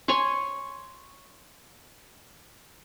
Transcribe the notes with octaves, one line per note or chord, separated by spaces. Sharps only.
C#5 G#5 C6 C#6